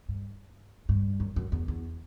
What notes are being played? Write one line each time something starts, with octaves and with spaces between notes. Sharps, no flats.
G2
G2
F#2
F#2
E2
E2